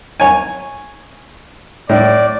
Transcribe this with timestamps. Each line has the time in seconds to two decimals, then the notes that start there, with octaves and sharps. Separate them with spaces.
0.20 C#5 G#5
1.89 A2 D5